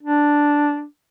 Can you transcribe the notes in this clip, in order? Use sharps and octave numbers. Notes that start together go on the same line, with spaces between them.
D4